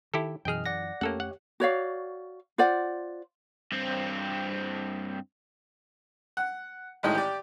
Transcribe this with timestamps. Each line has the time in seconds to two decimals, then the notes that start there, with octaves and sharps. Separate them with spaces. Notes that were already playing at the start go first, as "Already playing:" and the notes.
0.14 D#3 E4 G4 A4
0.45 F#2 B2 E3 G#4 D#5 G5 F6
0.66 D5 F#5 A#6
1.01 F2 A3 A#3 C#4 G4 A4 C#5 F#5
1.20 F#5
1.60 F#4 C#5 D5 F5
2.58 F4 C5 D5 F#5
3.72 G2 C4
6.37 F#5
7.03 A1 A2 D#3 G#3 D#5 G5
7.15 G4 D5